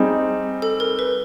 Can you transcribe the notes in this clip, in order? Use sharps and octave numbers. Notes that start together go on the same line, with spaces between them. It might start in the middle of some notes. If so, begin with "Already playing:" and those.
Already playing: G3 C4 D#4 G#4
A4
A#4
B4